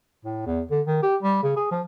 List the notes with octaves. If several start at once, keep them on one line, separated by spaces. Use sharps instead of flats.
A2
E2
D3
D#3
G4
G3
C#3
G#4
F3